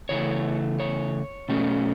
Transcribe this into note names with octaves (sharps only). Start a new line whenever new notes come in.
C#3 E3 A3 C#5
C#5
B2 A3 C#4